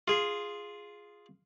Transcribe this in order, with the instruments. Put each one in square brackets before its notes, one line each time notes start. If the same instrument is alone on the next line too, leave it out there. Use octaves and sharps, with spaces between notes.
[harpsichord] F4 G#4